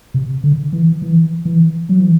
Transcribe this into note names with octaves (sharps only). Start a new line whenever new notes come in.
C3
D3
E3
E3
E3
F#3
E3